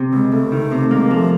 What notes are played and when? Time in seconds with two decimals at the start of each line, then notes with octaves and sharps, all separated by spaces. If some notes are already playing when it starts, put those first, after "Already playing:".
Already playing: C3
0.13 C#2 G#3
0.32 C#2 A3
0.52 D#3
0.72 C3
0.91 G#3 A#3
1.11 F3 A3